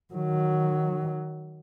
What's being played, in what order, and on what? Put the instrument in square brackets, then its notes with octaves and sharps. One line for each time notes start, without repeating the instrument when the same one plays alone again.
[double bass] D#3 F#3